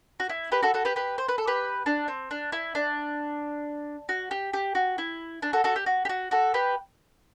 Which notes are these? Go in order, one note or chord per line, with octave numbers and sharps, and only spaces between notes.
F#4
E4
G4 B4
F#4 A4
F#4 A4
G4 B4
G4 B4
C5
B4
A4
G4 B4
D4
C4
D4
E4
D4
F#4
G4
G4
F#4
E4
D4
F#4 A4
F#4 A4
G4
F#4
G4
F#4
F#4 A4
G4 B4